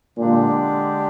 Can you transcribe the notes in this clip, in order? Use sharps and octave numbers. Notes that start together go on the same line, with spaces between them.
A#2 D3 G#3 D4 G4